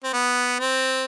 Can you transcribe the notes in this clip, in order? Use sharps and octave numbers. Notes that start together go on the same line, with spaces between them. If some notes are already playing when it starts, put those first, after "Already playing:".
C4
B3
C4